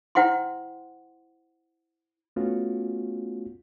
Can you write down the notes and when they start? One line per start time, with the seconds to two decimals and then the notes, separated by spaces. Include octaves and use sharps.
0.15 E4 C5 F#5 G5 C6
2.36 A3 B3 C#4 F4 F#4